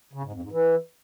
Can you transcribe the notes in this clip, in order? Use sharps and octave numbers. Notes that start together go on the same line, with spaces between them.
C#3
G#2
F2
G#2
E3